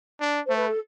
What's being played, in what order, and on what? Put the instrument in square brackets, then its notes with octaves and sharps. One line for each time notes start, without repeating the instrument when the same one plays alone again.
[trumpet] D4
[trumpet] A3 [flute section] C5
[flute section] B4
A4